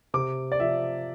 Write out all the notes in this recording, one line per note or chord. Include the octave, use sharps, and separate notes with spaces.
C3 D6
D5
F3 E5